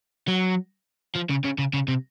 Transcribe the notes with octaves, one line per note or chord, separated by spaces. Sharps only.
F#3
F3
C#3
C#3
C#3
C#3
C3